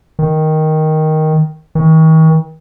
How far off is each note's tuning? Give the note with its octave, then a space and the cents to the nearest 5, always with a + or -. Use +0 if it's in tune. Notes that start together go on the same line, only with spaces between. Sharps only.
D#3 +5
D#3 +40